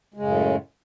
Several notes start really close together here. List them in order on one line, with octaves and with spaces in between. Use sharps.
G#3 C#3 F#2 A2